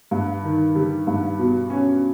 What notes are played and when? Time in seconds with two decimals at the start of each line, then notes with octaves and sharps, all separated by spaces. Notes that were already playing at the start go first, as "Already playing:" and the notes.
0.11 G2
0.43 D#3
0.75 G3
1.07 G2
1.39 B2
1.70 C#4